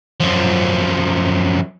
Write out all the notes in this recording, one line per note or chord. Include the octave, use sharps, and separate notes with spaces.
F#2 F3